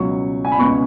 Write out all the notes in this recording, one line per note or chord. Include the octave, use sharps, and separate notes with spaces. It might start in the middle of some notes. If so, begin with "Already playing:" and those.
Already playing: C#2 B2 F#3 C#6
G#5
B5
C#2 B2 B3 C#6